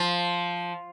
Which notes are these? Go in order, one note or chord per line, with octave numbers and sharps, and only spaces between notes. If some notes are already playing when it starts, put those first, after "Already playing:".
Already playing: F3